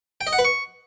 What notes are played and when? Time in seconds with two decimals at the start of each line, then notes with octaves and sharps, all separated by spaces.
0.21 G5
0.27 D#5
0.33 F#5
0.39 B4
0.45 C#6